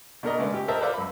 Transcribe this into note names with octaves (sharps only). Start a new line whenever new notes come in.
B2 D4 A#4 D#5
C#3 G#3 A3 B3 D4
G4
A#4 C5 D#5 E5 A5
A4 B4 C5 D5 E5 F5
F#2 B5